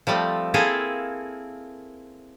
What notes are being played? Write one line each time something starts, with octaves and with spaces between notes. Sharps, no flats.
F3 G3 A3 C4
A#3 C4 E4 G#4 A4 F5